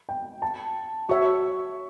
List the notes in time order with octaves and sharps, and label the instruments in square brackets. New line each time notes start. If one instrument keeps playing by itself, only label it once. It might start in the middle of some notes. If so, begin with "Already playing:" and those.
[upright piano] G5
A5
[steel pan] F#4 C#5 E5 [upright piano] C#6